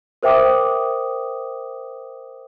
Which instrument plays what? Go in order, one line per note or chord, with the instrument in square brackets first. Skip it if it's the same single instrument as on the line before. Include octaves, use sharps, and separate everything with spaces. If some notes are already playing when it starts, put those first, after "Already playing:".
[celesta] A#4 C5 E5 G5 D6 D#6